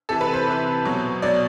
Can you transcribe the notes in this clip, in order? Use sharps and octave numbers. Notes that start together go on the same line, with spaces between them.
C3 E3 A4
B4
C5
C3 E3
B2 F#3
B2 F#3 D5